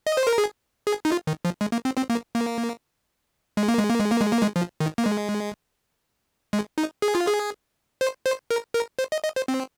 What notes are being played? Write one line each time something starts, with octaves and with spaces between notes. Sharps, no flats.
D#5
C5
A#4
G#4
G#4
D#4
F4
D#3
F3
G#3
A#3
C4
C4
A#3
A#3
G#3
A#3
G#3
A#3
G#3
A#3
G#3
A#3
G#3
F3
D#3
A#3
G#3
G#3
D#4
G#4
F4
G#4
C5
C5
A#4
A#4
C5
D#5
D#5
C5
C4